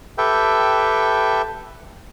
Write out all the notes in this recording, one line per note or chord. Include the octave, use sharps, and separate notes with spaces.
G4 A4 B4 E5 G5